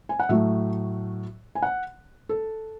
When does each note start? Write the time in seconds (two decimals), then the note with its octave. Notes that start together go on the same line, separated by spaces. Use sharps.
0.09 G#5
0.20 F#5
0.29 A2 F#3 A3 E5
1.55 G#5
1.63 F#5
2.29 A4